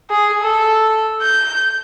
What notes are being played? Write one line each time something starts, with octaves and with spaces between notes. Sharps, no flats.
G#4
A4
G6